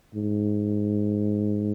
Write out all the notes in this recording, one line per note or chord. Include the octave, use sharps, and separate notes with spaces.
G#2